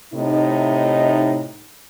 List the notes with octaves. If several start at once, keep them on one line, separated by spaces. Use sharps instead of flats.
A2 C3 D#4